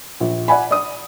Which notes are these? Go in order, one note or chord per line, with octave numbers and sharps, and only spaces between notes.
A#1
D5 F#5 G#5 B5
D5 D#6